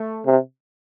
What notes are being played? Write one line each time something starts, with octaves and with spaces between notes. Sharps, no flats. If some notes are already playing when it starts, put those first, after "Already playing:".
Already playing: A3
C3